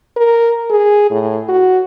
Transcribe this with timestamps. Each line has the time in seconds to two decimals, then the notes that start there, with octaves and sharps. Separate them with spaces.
0.16 A#4
0.70 G#4
1.11 A2
1.49 F#4